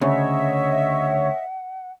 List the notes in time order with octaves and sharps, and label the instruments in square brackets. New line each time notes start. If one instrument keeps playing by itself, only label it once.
[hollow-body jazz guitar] D2 C#3 [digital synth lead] C#5 [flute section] D#5 E5 [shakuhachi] F#5